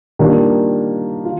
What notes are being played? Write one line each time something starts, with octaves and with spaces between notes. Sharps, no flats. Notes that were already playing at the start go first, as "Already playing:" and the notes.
D#3 G3 A#3 D4 F4
F4